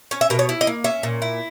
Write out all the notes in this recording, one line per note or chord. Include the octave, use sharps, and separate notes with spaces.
C#4 C#5
E5
B2 A#4
C#5
E4
D#5
A#3
C#4 E5
A#2
E4